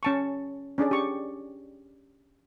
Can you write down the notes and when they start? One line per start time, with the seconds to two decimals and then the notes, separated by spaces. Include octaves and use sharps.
0.03 C#4 A5 C#6
0.78 C#4 D4 G#4 D5
0.91 G4 C#6